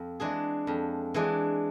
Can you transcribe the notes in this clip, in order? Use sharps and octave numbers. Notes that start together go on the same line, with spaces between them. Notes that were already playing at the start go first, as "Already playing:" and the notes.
Already playing: F2
E3 G#3 D4 G#4
F2
E3 G#3 D4 G#4